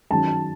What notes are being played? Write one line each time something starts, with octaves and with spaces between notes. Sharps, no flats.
F#2 D#3 F#3 A5